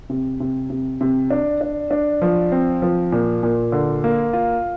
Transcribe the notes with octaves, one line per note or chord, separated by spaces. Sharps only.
C3
C3
C3
C3
D4
D4
D4
F3
C4
F3
A#2
A#2
D3
A#3
F4